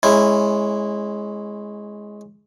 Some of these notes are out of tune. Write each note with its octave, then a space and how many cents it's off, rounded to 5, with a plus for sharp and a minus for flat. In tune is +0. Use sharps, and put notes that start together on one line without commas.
G#3 +5 C#4 -20 E4 +0